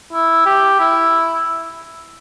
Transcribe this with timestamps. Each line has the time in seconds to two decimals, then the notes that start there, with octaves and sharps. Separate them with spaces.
0.13 E4
0.46 G4
0.80 E4